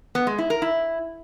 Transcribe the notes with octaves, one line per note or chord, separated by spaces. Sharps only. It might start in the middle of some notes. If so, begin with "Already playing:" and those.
B3
G#3
E4
A#4
E4